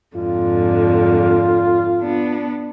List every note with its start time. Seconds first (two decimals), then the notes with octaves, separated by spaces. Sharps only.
0.16 F2 G#2 D3 F4
2.01 B3 D4